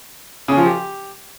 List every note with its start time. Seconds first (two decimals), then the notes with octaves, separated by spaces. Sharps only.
0.48 C#3
0.57 F3
0.66 G4